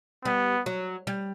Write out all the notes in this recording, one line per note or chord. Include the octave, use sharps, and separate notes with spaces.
G3 B3
F#3
G3